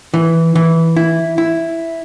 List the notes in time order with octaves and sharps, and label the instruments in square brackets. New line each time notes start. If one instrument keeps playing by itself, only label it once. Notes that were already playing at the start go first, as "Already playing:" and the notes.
[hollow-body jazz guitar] E3
E3
E4
E4